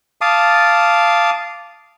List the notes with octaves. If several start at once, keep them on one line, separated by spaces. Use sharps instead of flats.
F5 A5 D6 D#6